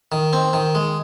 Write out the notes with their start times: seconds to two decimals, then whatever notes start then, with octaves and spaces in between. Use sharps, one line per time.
0.12 D#3
0.33 C4
0.53 D#3
0.75 G#3